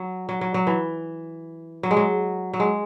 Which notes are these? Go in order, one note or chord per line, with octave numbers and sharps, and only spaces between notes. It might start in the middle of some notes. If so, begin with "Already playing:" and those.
Already playing: F#3
F#3
F#3
F#3
E3
F#3
G#3
F#3
F#3
G#3